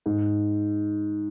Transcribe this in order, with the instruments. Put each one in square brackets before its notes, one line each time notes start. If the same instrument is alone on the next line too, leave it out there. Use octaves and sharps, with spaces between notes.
[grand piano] G#2